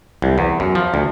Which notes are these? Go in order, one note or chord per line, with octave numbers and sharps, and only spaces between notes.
C2
E2
F#2
F3
D2